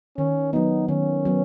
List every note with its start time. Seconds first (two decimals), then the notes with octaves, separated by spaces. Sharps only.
0.18 D#3 C#4
0.53 F#3 B3 D#4
0.88 D#3 C#4
1.25 F#3 B3